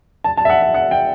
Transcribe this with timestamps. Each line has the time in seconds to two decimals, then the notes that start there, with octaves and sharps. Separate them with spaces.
0.24 A5
0.37 A5
0.45 E5
0.50 F#5
0.62 E5
0.74 F#5
0.91 G5